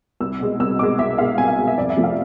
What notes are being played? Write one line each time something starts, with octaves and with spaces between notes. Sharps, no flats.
C2 E6
B2 G#3
C2 E6
B2 G#3 D6
C2 E5
B2 G#3 F5
C2 G#5
F5
B2 G#3
E5
F2 D5
E5
C3 F3 A3 C4
F5